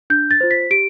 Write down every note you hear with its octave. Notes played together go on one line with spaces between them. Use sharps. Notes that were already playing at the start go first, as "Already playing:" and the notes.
D4 G6
A6
F4 C5
B6
G4 D7